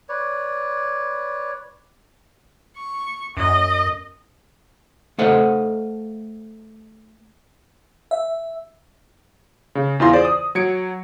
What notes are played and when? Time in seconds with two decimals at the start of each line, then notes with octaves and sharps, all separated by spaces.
0.09 B4 C#5 D5
2.77 C#6
3.37 F#2 D#5
5.18 A3 A4 C5 D#5 F5 F#5
8.11 E5
9.75 C#3
10.00 E2 E3 F4 G#5 C6 A#6
10.13 G#4 C5 D5
10.25 D#6
10.55 F#3 G#6 C#7 D7